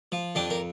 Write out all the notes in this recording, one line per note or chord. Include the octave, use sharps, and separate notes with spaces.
F3
F2 D4 G4
A#4